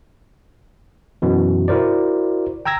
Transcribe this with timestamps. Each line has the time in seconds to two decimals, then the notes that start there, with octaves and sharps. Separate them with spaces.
1.22 F#2 B2 E3
1.68 E4 F#4 A#4 C5 D5
2.65 G5 A#5 E6 G#6 A#6